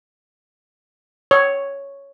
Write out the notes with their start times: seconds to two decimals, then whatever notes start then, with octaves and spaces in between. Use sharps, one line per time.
1.31 C#5